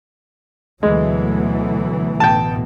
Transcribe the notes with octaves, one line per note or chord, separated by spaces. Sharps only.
D2 B2 E3 F#3 G#3 A3
A1 B2 G5 A5